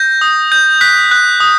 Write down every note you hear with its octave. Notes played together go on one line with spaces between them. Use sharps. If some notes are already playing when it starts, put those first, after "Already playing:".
Already playing: G6 A#6
D#6
G6
F#6 B6
F#6
D#6